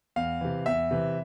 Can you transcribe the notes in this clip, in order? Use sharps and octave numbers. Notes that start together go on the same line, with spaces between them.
E2 F5
C3 E3
E2 E5
C3 E3